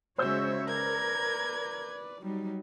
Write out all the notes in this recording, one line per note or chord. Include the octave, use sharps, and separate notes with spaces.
C#3 G#3 F#4 C5 C#5 E5 E6 G6
A#4 B4 D5 G#6
F#3 G3 D#4